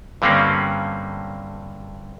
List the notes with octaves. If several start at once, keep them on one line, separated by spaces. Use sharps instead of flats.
G2 D3 G3 A#3 C4 C#4